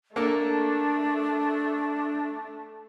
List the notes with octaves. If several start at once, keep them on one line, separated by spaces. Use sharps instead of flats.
A3 A#3 D4 A4 A#4